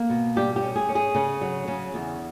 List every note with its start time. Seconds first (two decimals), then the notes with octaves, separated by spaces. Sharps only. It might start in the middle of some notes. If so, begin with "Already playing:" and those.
Already playing: A#3
0.09 B2
0.36 G3 G4
0.56 G4
0.62 C#4
0.76 G#4
0.89 C#4
0.95 G#4
1.15 C#3
1.41 F#3
1.68 C#3
1.94 E2